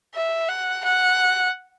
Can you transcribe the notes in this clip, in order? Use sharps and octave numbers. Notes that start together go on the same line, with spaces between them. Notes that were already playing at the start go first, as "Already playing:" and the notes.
E5
F#5
F#5